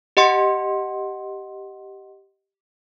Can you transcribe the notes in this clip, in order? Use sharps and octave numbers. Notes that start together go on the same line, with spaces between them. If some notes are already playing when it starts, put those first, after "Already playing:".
G4 D#5 F#5 C6 C#7